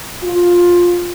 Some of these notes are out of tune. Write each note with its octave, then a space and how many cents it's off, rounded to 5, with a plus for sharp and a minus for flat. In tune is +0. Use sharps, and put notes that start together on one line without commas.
F4 +10